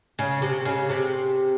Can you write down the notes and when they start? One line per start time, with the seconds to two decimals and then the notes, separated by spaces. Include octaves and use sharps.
0.19 C#3
0.42 C3
0.65 C#3
0.89 C3